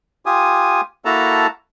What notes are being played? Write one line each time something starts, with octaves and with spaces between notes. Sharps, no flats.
F4 G4 G#5 D#6
A#3 E4 F#4 A4 A5 A#5